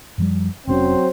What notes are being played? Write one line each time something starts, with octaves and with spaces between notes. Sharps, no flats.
F#2 F3 G3
F1 G#2 F#3 C4 C#4 C5